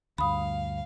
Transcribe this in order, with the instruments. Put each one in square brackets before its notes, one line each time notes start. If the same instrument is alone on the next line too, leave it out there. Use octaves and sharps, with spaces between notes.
[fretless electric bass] D2 G2 [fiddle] F5 [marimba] B5 D#6